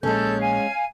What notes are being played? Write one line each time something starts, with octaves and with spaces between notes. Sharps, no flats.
A#1 A#2 G#3 A#3 C#4 A4 G6
F5 G#5